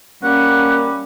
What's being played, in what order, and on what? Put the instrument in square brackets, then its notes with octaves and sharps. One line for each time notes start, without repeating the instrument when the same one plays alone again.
[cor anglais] G3 [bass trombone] A#3 [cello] C#4 [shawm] F#5